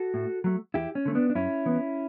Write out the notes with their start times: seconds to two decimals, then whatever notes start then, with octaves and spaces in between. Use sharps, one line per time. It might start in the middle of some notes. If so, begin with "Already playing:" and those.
Already playing: F#4 A4
0.14 A2
0.44 F#3 A3
0.74 E2 E4 G4
0.95 C#4
1.05 D3 A3
1.15 B3 D4
1.30 D4
1.35 F#2 C#4 E4
1.66 E3 B3